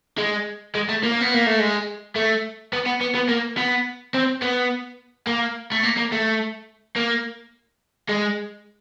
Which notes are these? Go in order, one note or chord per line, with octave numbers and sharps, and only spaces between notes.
G#3
G#3
A3
A#3
B3
A#3
A3
G#3
A3
B3
B3
B3
B3
A#3
B3
C4
B3
A#3
A3
A#3
A#3
A3
A#3
G#3